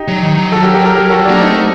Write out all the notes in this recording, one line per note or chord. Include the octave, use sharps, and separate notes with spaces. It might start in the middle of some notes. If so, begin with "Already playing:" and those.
Already playing: D#4 G4
F#3
D#3
F#3
F#4 A4
G4 A#4
G4 A#4
G4 A#4
G4 A#4
F#4 A4
A#3 D4 F#4
A3 C4 D#4